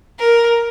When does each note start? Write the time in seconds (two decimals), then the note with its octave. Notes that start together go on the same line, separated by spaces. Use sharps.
0.19 A#4